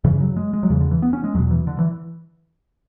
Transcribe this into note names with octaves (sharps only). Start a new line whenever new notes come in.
F#2 C#3 E3
F#3
G#3
G#3
F#3
E2 C#3 E3
D3
E3
B3
C#4
G#3
E2 B2 F#3
E3
D3
E3